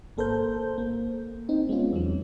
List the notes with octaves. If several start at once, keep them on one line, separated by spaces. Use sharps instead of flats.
G#1 A#3 A4 A#4 C5 G6
A#3
C4 D#4
G#3 B3 C#4 F4
E2 F#3